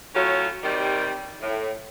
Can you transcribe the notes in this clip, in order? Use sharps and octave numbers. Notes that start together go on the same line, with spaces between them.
A2 F#3 C#4 F4
C3 D#3 G3
A2